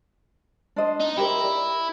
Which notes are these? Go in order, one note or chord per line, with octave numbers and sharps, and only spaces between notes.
D4 C5 D#5
D#4
E4 G4 A#4 C5
A#4 D5